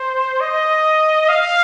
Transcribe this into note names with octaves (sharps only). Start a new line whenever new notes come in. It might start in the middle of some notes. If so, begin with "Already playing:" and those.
Already playing: C5
D#5
F5